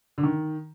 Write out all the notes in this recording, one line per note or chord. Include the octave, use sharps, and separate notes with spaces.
D3
D#3